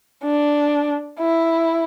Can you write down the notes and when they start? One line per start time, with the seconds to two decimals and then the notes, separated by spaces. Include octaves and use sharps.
0.24 D4
1.19 E4